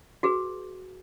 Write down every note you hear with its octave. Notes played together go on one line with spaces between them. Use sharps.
F#4 G#4 B4